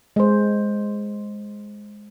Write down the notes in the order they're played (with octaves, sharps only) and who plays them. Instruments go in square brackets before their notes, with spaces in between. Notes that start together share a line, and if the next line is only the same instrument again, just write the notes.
[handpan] G#3 C5